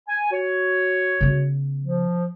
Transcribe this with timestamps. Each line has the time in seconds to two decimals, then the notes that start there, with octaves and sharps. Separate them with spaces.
0.07 G#5
0.31 F#4 C#5
1.21 C#3 B3
1.81 F3